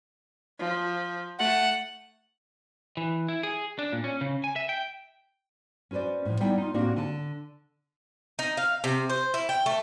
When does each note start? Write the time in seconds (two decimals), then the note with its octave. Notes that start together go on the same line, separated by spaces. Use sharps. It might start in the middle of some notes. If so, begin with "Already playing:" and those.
0.59 F3
1.39 A3 F#5
2.97 E3
3.28 E4
3.43 G#4
3.79 D4
3.93 A#2
4.04 C#4
4.21 C#3
4.44 G#5
4.56 E5
4.69 G5
5.91 C#4 F#4 B4 C5 D5
6.25 A2 F3
6.40 G3 B3 D#4 E4 D5 G5
6.58 D#4 F4
6.74 A2 A#3 C4 D4 F#4 G4
6.96 D3 A5
8.39 D#4
8.57 F5
8.84 C3
9.10 C5
9.34 E4
9.49 G5
9.66 A3